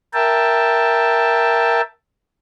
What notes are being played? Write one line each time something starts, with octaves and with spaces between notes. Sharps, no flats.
A#4 E5 G5 A5